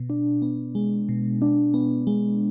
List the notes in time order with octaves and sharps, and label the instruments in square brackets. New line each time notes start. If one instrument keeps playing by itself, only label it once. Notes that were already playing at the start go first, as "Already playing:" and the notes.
Already playing: [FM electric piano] B2
D4
B3
G#3
B2
D4
B3
G#3